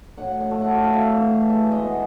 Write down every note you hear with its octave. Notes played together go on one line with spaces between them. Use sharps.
A2 F#5
F#5
A3
F#5
A3 F5
E5
F5
E3
G#3 E5
D#5
B3